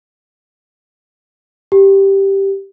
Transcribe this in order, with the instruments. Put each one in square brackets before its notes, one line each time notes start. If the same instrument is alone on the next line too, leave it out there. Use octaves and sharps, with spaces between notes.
[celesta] G4